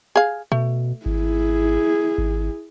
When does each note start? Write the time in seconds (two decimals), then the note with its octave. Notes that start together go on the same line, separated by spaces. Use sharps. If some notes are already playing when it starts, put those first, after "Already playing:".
0.16 G#4 F5
0.52 B2 A3
1.06 G#1 E4 G#4
2.18 G#1